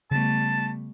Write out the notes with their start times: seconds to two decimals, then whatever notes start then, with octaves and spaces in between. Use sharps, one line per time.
0.11 C#3 G3 A3 B3 A5